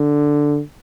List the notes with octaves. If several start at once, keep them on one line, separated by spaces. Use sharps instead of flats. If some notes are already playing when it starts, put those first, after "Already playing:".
Already playing: D3